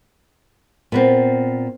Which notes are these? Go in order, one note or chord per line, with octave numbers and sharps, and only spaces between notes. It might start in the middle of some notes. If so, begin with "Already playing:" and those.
A#2 B3 C4